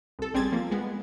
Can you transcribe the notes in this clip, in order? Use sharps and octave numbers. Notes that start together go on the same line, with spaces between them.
C2 A4
A1 G3 C4 G#4 G#6 A6
F3 A#3
G#3 B3